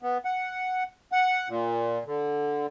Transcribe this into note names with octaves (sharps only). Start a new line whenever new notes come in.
B3
F#5
F#5
A#2
D3